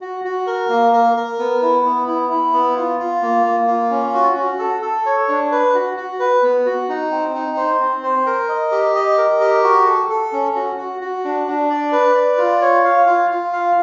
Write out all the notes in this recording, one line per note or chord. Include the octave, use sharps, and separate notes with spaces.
F#4
F#4
A#4
A#3
A#4
A#4
B3
E4
B3
E4
E4
B3
F4
F4
A#3
A#3
F4
C#4
F#4
F#4
A4
A4
C#5
D4
B4
F#4
F#4
B4
B3
F#4
D#4
C4
D#4
C5
C4
C5
A#4
D#5
G4
D#5
A#4
G4
F#4
A4
A4
C#4
F#4
F#4
F#4
D4
D4
D5
B4
D5
F4
C#5
F5
F4
F4
F5